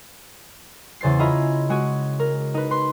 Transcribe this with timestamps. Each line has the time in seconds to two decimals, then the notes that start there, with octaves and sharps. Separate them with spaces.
1.01 E2 C#3 C5 A6 C7
1.19 E4 F4 G#4 D#5 A#5 B5
1.69 G#3 F#4 G#4
2.19 A#4
2.54 D#4 B4
2.71 B4 C6